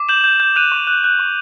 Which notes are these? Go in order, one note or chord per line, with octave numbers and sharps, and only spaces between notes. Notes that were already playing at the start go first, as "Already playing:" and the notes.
Already playing: D6
G6 E7 F#7
G6
G6
F#6 D#7 F7
C#6
F#6
F#6
C#6